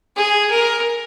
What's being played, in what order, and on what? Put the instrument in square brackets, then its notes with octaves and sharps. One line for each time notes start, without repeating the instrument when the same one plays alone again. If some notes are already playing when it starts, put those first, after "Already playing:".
[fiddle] G#4
A#4